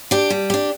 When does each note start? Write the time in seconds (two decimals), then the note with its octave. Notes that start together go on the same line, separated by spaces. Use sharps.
0.11 D4 G4
0.30 G3
0.50 D4 G4